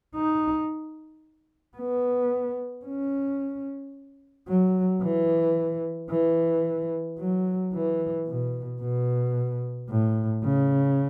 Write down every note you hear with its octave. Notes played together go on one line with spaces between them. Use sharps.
D#4
B3
C#4
F#3
E3
E3
F#3
E3
B2
B2
A2
C#3